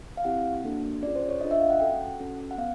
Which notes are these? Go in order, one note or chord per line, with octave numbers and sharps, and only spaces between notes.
F5
C4 E4 G4 F#5
A#3 D4 F#4 A4
C#4 F4 G#4 D5
C5
C#5
D4 F4 A4 D#5
E5
F5
F#5
C#4 F#4 A4 G5
F#5
C#4 F#4 A4
F#5
B3 F5